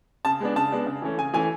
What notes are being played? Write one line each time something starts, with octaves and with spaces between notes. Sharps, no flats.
C#3 A5
G#3 B3 D4
C#3 A5
G#3 B3 D4
C#3
E3 A3 C#4
C#3 G#5
E3 A3 C#4 G#5